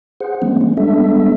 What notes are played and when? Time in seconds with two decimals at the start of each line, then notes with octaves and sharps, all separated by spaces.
0.21 G#4 C5 F#5
0.42 E3 G3 G#3 A#3 C4 C#4
0.61 G#3 A#3 C#4
0.77 G3 G#3 B3 D4 A4 E5